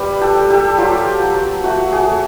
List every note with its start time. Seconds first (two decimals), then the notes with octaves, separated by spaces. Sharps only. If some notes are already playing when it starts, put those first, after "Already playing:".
Already playing: G3 B4
0.21 G4 A4
0.36 G3
0.50 G4 A4
0.78 F#3 F4 G4
1.22 F#3
1.64 A3 F#4
1.92 F#4 G#4
2.07 A3